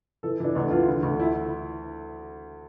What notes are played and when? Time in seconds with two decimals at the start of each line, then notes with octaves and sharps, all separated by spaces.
0.23 E3 A4
0.40 E3 D4
0.55 D2 D4
0.71 E3 F4
0.88 D3
1.03 D2
1.20 E4